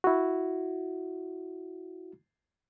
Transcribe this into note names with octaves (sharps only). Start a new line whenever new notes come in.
E4 F#4